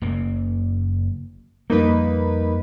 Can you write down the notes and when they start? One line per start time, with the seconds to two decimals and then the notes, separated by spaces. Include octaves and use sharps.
0.02 F#1 C#3 A#3
1.70 F2 G3 A#3 D#4 B4